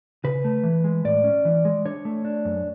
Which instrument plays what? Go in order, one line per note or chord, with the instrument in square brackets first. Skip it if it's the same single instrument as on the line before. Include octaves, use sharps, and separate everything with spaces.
[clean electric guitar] C#3 B4
A3
E3
G#3
A2 D5
C#4
E3
G#3
D4 C#5
A3
D4
F#2